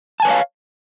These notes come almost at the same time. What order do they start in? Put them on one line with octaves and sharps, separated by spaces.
A5 G#5 B4 C#5 F5